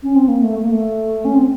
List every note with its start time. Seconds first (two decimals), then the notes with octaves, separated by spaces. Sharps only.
0.03 C#4
0.15 C4
0.28 A#3
0.42 A3
0.62 A#3
0.71 A3
1.25 C#4
1.35 C4